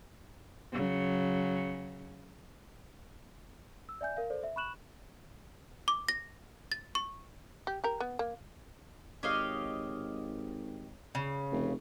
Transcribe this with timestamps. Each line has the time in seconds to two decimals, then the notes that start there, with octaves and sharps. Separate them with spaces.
0.72 C#3 F#3
3.89 E6
4.01 D5 E5 G#5 G6
4.17 A#4 F5
4.30 A4 C5 D5
4.43 E5
4.56 B5 C#6 F#6 E7 F#7
5.88 D6
6.08 A#6
6.72 A6
6.95 C#6
7.67 G4
7.84 G4 A#4
8.00 B3
8.19 A#3
9.23 G#1 G4 C#5 D#5 F5
11.15 C#3
11.52 F1